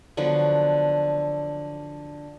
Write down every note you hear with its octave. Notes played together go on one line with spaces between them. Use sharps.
D3 F3 F#3 B3